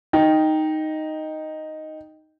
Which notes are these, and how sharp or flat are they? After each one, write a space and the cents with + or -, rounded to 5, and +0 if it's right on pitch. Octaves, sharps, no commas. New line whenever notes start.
D#4 +0 G5 +0